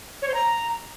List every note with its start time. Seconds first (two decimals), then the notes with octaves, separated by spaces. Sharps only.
0.22 C#5
0.28 C5
0.34 A#5